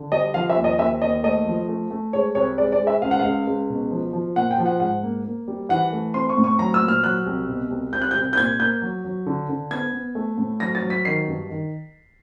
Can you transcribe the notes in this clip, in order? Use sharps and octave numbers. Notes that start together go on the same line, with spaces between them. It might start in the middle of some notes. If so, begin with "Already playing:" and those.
Already playing: D3
G3 D#5
F3 F5
E5
D#2
D#5
D#2 E5
D#2 D#5
A3 D#5
F3
A3
A3
G#3 C#5
C2 C#5
G#3 D5
D5
G#3
E5
C#2 F5
F#5
C#2 F5
C#2
B2
F3
F3
A#2 F#5
G5
F3
F#5
G#2 F#5
A#3
A#3
G3
E3 F#5
A3
C4 C6
C#6
A2
C#6
F#3 A#5
E6
A#2
F6
F#3 F#6
C2
B2
C2
C2 G6
F#6
G6
C2
G6
A#2 G#6
A#3 G6
F#3
F#3
D3
D3
B3 G#6
B3
A3
A2
F#3 A#6
A6
F#3
B6
D#3 C7
G2
D#3